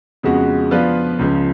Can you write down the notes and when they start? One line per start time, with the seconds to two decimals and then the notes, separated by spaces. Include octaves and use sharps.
0.23 F2 C#3 G#3 B3 F#4
0.71 F3 B3 D4 F4 B4
1.19 C#2 C#3 F3